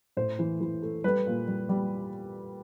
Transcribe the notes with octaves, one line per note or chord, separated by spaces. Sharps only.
A2 C5
E3
E3
A3
G3 B4
A#2
G3
G3